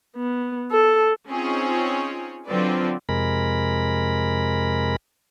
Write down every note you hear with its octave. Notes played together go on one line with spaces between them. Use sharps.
B3
A4
C4 C#4 D#4 F4 G#4 C#5
D3 F#3 C4 F4 B4 D5
F2 C3 G#3 A#4 B5